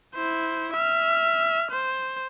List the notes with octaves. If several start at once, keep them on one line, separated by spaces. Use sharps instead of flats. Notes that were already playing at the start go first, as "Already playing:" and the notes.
E4 C5
E5 F6
C5